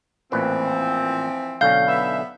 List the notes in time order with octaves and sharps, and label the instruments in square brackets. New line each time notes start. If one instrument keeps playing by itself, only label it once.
[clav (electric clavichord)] A1 A#2 B4 [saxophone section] E3 F3 C4
[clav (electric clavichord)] B1 D3 C#4 [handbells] F5 G6
[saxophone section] B3 B4 E5